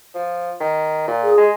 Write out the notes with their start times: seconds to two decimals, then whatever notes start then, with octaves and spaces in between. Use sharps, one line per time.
0.14 F3
0.60 D#3
1.08 A#2
1.24 G#4
1.38 G#3